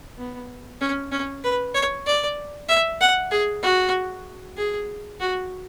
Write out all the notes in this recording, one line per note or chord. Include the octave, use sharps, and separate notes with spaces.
B3
C#4
C#4
B4
C#5
D5
E5
F#5
G#4
F#4
G#4
F#4